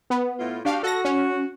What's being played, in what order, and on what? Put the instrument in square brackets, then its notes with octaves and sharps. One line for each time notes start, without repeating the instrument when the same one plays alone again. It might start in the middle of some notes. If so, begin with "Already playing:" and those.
[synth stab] B3
[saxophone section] A2 E4 F4
[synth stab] D4 F5 [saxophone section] F#4 G4
[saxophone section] F#4 [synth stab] A4 A#6
[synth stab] C#4